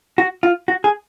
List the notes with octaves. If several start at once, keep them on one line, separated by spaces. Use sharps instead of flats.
F#4
F4
F#4
G#4